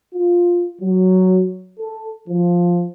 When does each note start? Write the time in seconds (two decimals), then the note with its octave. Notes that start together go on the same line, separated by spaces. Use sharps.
0.14 F4
0.81 F#3
1.80 A4
2.29 F3